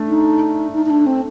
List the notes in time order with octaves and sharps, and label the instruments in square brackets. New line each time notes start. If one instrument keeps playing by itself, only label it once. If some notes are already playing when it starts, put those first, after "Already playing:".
Already playing: [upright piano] A3 D4
[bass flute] D#4
D#4
D#4
D4
C4